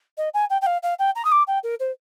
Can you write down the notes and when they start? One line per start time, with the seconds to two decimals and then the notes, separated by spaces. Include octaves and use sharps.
0.18 D#5
0.34 G#5
0.50 G5
0.62 G5
0.66 F5
0.83 F5
0.99 G5
1.16 A#5
1.25 D#6
1.32 D6
1.47 G5
1.64 A#4
1.80 C5